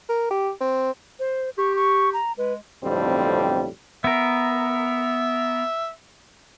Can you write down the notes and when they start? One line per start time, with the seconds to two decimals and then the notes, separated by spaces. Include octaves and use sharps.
0.09 A#4
0.31 G4
0.61 C4
1.19 C5
1.58 G4 C#6
1.76 C#6
2.13 A#5
2.38 G#3 B4
2.82 B1 F2 A2 D3 G3 C4
4.04 B3 A#4 E5